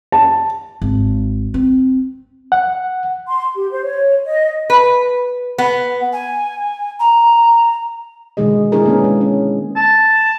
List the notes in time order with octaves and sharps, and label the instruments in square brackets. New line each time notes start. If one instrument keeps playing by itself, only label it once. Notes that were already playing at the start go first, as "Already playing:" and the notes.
[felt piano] A5
[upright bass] G#1
C4
[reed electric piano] F#5
[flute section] C6
G4
C5
C#5
D#5
[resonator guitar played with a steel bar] B4
B3
[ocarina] G#5
A#5
[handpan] B2 D3 D#3 G#3 G#4 D#5
G#3 B3 D4 E4 G#4 A#4
A#3 B3 C#4 A#4
G#3
C#4
[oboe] A5